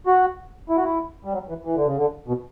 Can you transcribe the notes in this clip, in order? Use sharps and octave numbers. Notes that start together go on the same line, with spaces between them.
F#4
E4
F#4
E4
G3
F#3
E3
E3
D3
C#3
D3
B2